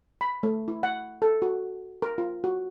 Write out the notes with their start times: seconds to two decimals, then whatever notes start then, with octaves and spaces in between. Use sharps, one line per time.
0.21 B5
0.43 A3
0.68 E4
0.83 F#5
1.22 A4
1.42 F#4
2.02 A#4
2.18 F4
2.44 F#4